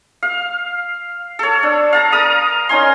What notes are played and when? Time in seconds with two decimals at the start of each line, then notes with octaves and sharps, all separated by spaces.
0.23 F5
1.39 A4 C#5
1.63 D4
1.93 F5 A5 A#5
2.12 A#4 A#5 D#6
2.69 C#4 D#4 G#5 C6